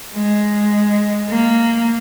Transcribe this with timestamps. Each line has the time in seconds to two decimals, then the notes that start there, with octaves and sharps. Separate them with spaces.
0.14 G#3
1.29 A#3